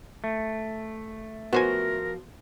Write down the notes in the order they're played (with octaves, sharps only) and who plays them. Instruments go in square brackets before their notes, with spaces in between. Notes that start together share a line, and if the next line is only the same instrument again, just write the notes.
[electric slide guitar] A3
[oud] F3 F#4 [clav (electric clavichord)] B3 C5 G#5 [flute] A#4